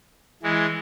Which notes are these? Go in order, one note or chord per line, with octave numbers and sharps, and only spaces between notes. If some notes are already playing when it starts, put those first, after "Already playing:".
E3 G#3